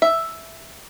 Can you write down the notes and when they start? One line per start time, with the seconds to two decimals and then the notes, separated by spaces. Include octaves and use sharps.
0.02 E5